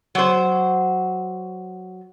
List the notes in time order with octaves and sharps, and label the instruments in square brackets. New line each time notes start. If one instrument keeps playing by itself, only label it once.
[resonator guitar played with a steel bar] F#3 C5